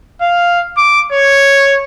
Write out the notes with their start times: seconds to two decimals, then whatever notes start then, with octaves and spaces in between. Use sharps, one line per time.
0.21 F5
0.77 D6
1.12 C#5